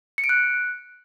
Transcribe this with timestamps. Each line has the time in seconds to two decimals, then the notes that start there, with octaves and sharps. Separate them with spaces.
0.18 C#7
0.24 D7
0.29 F#6